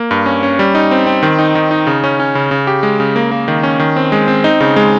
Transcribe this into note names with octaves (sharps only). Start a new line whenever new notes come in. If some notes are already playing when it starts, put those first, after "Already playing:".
Already playing: A#3
G2
C#4
C#4
G3
D#4
C4
C4
D#3
D#4
D#3
D#4
C#3
C#4
C#4
C#3
C#3
G4
G#3
C#3
A#3
A#3
D#3
C#4
D#3
C4
G#3
C4
D#4
C#3
G#3